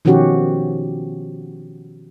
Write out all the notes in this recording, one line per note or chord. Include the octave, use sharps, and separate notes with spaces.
B2 D#3 F3 C#4 F#4 G4